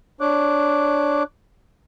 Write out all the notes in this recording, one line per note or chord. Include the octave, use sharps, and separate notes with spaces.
D4 C#5 D6 F#6